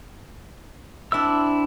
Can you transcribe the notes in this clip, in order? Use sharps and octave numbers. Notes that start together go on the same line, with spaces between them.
C4 D4 E4 E5 E6